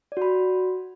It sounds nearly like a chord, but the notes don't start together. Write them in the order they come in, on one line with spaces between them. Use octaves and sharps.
D5 F#4 B5